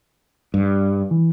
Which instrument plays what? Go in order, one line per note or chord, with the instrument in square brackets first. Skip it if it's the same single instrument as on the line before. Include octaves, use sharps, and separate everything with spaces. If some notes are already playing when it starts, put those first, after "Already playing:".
[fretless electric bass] G2
[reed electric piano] E3